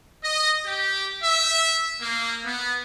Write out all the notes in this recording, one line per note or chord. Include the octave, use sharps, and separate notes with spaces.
D#5
G4
E5
A#3
B3